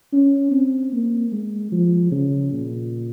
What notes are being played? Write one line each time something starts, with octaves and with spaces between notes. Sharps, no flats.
C#4
C4
A#3
G#3
F3
C#3
A#2